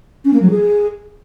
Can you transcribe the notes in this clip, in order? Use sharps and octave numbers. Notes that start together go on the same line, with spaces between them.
C#4
A#3
F#3
G#4